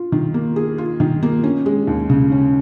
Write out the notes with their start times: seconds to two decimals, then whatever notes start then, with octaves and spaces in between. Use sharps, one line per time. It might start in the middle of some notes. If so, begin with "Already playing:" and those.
Already playing: F4
0.12 D#3
0.34 A#3
0.56 G#4
0.78 F4
1.00 D#3
1.23 A#3
1.44 C#4
1.66 G#3
1.87 D#2
2.09 C#3
2.32 C#4